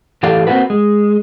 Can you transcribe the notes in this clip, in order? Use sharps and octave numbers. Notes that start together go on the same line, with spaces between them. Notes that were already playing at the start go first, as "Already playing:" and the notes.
A2 E3 G4 A4 D5 F5
A#3 C4 D#4 F4 F#4 B4
G#3